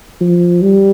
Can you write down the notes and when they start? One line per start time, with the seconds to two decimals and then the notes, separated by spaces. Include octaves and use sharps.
0.21 F3
0.62 G3